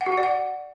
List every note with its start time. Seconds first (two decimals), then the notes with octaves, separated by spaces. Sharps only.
0.01 F#5
0.06 F#4
0.12 F#5
0.18 D5
0.23 F#5